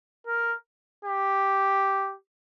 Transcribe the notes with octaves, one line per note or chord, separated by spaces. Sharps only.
A#4
G4